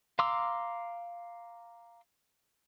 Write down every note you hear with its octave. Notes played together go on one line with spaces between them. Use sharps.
F5 A#5 C6 D6 E6